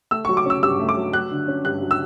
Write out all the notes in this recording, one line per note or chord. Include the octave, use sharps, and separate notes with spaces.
A3 E6
F#3 C#6
D6
C#4 E6
G2 E6
A3
D6
F#3
F#3 F#6
D3
C#4
G2 F#6
F#3
E6